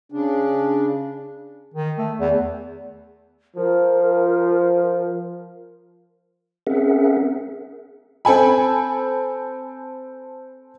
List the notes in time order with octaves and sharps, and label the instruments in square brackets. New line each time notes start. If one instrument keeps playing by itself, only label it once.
[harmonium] C#3 D4
[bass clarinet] D#3
A3
E2
[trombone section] F3 [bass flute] A#4
[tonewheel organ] C4 C#4 G#4 A#4 E5 F#5
[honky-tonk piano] C4 A4 G#5 B5